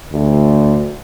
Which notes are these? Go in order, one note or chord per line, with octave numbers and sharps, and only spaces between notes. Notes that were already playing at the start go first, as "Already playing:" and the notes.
D2